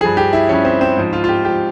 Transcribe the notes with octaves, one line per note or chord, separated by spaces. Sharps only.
G2 F3 G#4
G4
E4
G2 F3 C#4
C4
C4
G#2 F3
F4
F4
G4
G#2 F3 G4